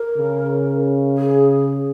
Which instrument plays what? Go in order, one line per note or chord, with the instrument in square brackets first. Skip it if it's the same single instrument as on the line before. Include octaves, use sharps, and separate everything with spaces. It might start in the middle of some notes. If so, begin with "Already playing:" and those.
Already playing: [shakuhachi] A#4
[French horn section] C#3
[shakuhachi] G#4